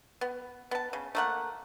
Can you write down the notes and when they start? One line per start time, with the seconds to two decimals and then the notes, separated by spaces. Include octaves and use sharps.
0.21 B3
0.71 B3 A5
0.93 C#3
1.15 A3 A#3 F#5